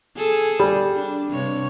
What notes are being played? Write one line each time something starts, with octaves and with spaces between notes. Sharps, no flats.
G#4 A4
G3
D4
G2 C3 C#5